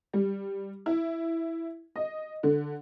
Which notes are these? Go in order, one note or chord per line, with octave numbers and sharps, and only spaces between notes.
G3
E4
D#5
D3